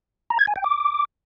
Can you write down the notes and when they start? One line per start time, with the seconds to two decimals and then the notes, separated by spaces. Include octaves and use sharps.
0.30 A#5
0.39 G#6
0.47 G#5
0.56 G5
0.64 D6